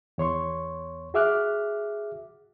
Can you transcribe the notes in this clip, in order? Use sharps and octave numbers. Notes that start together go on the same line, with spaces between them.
E2 C#5 C6 C#6
F#4 G#4 E5 D6 F6 F#6